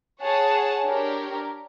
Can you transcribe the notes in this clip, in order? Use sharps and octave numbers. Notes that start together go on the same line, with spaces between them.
G#4 C#5 F#5 A5
D4 G4 A#4 C#5